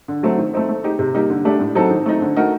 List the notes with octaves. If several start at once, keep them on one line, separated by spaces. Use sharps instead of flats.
D3
F#3 A3 C4
D#3
A3 C4 D#4
A3
D#4 G4
C3
G3 A#3 D#4 G4
D3
A3 D4 G4
A2
F#3 C4 D#4 A4
D#3
A3 C4 D#4
D3
A3 D#4 F#4 A#4